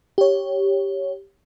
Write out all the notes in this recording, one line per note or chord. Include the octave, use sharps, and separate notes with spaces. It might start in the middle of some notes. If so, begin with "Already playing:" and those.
G4 C#5